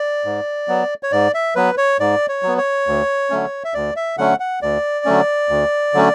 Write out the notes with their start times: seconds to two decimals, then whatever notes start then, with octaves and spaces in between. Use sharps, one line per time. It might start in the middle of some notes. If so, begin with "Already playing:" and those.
Already playing: D5
0.25 G#2
0.68 F#3 B3
1.03 C#5
1.12 G#2 D5
1.35 E5
1.56 F#3 B3 B4
1.78 C#5
2.00 G#2 D5
2.29 C#5
2.43 F#3
2.48 B3
2.58 C#5
2.87 D2
3.30 D3 F#3 A3 C#4
3.64 E5
3.74 D2 D5
3.96 E5
4.18 D3 F#3 A3 C#4 F#5
4.40 F#5
4.62 D2 D5
5.05 D3 F#3 A3 C#4
5.49 D2
5.94 D3 F#3 A3 C#4